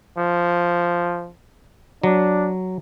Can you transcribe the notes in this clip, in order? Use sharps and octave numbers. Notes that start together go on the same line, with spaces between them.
F3
F#3 D4